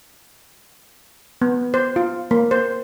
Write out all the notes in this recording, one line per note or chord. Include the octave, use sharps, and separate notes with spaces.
B3
C5
F4
A#3
C5